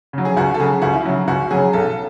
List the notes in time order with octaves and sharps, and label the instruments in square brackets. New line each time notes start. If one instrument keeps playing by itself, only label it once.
[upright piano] C#3 F#3
[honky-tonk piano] G#4
[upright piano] C#2 [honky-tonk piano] F#4
[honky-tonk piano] A4
[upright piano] C#3 F#3 [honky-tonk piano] G#4
[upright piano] C#2 [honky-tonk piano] F#4
[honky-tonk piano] E4
[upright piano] C#3 F#3
[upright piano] C#2 [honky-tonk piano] F#4
[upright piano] C#3 F#3 [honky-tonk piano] G#4
[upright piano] B1 [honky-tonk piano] A4